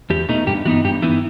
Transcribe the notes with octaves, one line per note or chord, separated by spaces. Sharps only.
E2 G4
B2 A3 D#4
G2 G4
E3 B3 D#4 F#4
G2 G4
E3 B3 D#4 E4